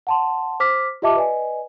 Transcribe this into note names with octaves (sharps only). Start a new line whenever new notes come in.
F#5 A5 C6
C5 D6 F6 B6
F4 G4 D#5 E5 A5 D6
B4 D5 D#5 G#5